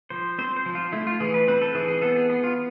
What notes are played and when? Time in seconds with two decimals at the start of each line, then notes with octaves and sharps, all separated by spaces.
0.10 F3 C5
0.38 C4 C5
0.56 C5
0.66 F3
0.75 F4
0.92 A3 E4
1.07 F4
1.20 E3 G#4
1.34 B4
1.48 C4 B4
1.62 A4
1.75 E3 G#4
1.88 G#4
2.02 B3 A4
2.16 G#4
2.29 B3 G#4
2.44 F4